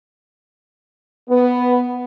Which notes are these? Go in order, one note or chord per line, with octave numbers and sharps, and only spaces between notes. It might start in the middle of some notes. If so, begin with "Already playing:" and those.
B3